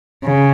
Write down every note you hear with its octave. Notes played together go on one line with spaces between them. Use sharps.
C#3